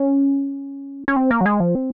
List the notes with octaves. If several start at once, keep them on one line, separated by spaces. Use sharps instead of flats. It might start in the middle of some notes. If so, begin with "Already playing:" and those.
Already playing: C#4
C#4
C4
A#3
F#3
G#3
F3
C4